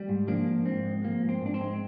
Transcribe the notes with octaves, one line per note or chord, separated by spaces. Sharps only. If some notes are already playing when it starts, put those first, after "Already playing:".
Already playing: G3
G#2
F3 A#3 D4
G#2
G#2 C4
G#3
F3 A#3
G#2
C4
G#2 D4
C4
G#3